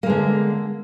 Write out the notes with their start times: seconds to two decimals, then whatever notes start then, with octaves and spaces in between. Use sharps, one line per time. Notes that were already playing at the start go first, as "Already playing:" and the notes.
0.03 A#3
0.06 G#3
0.10 D3